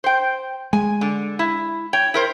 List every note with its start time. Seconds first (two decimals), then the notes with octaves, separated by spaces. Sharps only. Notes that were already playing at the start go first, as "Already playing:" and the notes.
0.04 C5 G5
0.73 G#3 G#5
1.01 D3
1.39 E4
1.93 C#5 G5
2.14 E4 A#4 C5